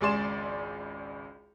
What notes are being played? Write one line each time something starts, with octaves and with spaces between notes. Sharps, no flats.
G#1 C#2 G#4 D5 C6 E7